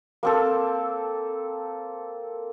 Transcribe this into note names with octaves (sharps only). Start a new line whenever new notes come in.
A#3 C4 A4